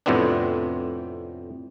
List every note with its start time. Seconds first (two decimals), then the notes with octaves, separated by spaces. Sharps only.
0.06 F2 A2 C3 B3 C4 D4